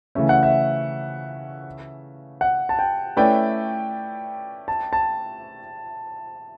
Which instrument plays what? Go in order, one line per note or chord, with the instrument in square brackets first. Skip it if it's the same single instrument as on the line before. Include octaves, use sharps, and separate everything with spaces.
[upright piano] C#3 E3 A3 C#4 [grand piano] E5
[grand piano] F#5
E5
F#5
A5
G5
[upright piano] A3 C#4 E4 B4 D5 [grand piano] G5
[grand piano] A5
A5